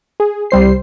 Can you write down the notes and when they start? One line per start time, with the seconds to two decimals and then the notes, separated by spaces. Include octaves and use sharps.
0.20 G#4
0.51 C2 G3 C5 C7